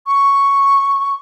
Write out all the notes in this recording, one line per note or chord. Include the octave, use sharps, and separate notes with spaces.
C#6